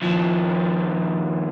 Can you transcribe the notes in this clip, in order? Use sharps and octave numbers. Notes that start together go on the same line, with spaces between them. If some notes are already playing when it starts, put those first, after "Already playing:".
D#2 F3